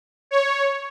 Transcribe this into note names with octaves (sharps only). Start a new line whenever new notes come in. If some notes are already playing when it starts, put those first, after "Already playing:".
C#5